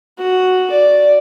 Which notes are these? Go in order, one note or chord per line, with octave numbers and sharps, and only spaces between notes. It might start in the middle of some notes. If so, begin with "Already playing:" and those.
F#4
D5